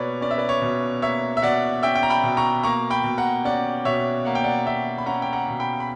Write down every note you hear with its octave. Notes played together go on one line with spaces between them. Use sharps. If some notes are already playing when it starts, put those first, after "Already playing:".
Already playing: B2 A#3 B4 C#5 D5
C#4 D5
E5
B4 D5
C#5
B2
A#3 C#5 E5
E5
B2 D5 F#5
C#4 E5 G5
G5
A#5
G5 B5
B2
A#5 C#6
A#3 A#5 C#6
G5 B5
B2
F#5 A#5
C#4 D5 F#5
B2 C#5 E5
A#3 F#5
G5
D5 F#5
B2 E5 G5
B5
C#4 F#5 A#5
G5
F#5 A#5
B2
G5 B5
B5